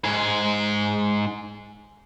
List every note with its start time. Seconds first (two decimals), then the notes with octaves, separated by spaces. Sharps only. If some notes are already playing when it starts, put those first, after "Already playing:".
0.04 G#2 G#4